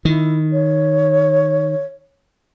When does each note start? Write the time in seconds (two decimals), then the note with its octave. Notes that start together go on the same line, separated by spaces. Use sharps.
0.05 D#3 E4
0.52 C#5